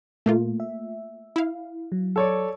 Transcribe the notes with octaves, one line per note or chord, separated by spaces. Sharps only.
A#2 A3 A#3 F4
E5
E4 F5
F#3
A4 C#5 D5